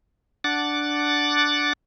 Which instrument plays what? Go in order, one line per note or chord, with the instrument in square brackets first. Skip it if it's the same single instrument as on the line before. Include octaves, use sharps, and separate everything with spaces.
[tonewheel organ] D4 F#5 D6 A6